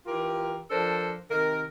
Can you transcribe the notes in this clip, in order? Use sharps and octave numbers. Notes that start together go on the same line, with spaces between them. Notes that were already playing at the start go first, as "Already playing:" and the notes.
E3 F4 G4 A#4
F3 D4 A4 A#4 C5
C3 D#3 A#4